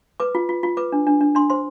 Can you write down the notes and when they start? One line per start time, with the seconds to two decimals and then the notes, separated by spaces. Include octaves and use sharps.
0.20 B4 D6
0.35 F4
0.49 F4
0.63 F4
0.77 B4 D6
0.92 D4
1.07 D4
1.21 D4
1.35 D4 C6
1.50 C5 C6